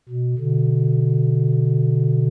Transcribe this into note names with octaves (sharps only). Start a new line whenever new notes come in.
B2
B2 D3